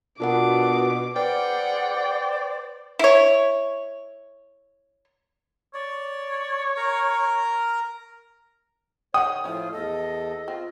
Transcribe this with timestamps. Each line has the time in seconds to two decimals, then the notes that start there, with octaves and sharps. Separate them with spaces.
0.20 B2 D4 F4 A#4 F#5 D6
1.16 G#4 B4 C5 D5 F#5 G5
2.99 E4 C#5
5.74 C#5 D5
6.77 A#4 A#5
9.14 D#3 C#5 F#5 G5 D#6
9.44 A2 F3 C#4 E4 F4
9.72 E2 A4 D#5
10.48 C4 F4